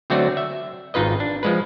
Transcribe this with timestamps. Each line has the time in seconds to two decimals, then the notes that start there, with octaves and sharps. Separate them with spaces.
0.10 D3 F#3 A3 C4 F#4 D5
0.37 E5
0.94 G#1 D#4 F4 B4 D#5
1.20 D4
1.43 F3 G#3 B4